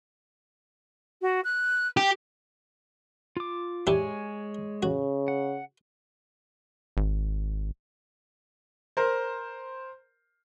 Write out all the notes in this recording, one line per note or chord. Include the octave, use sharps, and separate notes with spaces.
F#4
F#6
G4
F4 D6
G#3 D4 E4 G4 C#5 G#5
C#3 F#4
F#5
G#1
A#4 C5